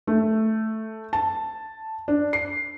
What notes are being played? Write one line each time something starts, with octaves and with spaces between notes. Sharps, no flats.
A3
A5
D4
C7